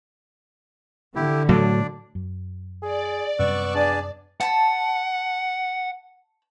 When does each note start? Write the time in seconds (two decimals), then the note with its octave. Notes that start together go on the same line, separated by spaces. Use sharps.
1.16 D3 E4 G4
1.49 A2 F#3 A3 D4 D5
2.15 F#2
2.82 G#4 D5
3.39 F#2 C3 G3 B3 C#6 E6 F#6
3.75 D4 G#4 A5
4.41 F#5 A5 B5